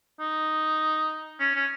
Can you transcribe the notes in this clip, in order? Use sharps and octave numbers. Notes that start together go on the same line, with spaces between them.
D#4
C#4
C#4